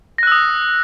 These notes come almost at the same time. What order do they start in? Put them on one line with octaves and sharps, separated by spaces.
A#6 F#6 E6 D#6